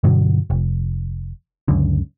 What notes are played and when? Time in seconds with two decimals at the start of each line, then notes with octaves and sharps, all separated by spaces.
0.04 G2 B2 D3 F#3
0.50 F1
1.68 C#2 F#2 D3